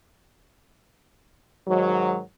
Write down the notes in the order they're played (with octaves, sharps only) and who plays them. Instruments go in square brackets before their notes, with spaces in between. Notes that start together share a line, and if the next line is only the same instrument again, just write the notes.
[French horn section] G#2 D#3 F#3